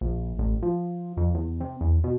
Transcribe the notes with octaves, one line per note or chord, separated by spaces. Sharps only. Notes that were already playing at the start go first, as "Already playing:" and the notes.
A#1
A1
F3
F2
E2
C3
E2
B2